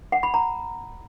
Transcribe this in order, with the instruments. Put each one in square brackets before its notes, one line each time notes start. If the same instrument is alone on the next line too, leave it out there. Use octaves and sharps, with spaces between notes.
[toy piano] F#5
B5
A#5